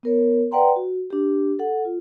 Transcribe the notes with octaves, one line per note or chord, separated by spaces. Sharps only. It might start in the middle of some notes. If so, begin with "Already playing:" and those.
B3 A#4 C#5
B4 D5 F#5 G5 A#5 C6
F#4
D4 G4
A4 F#5
F4